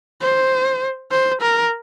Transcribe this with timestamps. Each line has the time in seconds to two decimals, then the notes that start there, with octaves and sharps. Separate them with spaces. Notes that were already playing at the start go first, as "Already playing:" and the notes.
0.22 C5
1.11 C5
1.41 A#4